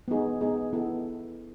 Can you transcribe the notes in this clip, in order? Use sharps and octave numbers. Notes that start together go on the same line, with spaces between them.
B3 D#4 G#4
B3 D#4 G#4
B3 E4 A4